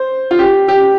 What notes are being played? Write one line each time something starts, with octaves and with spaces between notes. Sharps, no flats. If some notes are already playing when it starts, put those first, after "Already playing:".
Already playing: C5
F4
G4
G4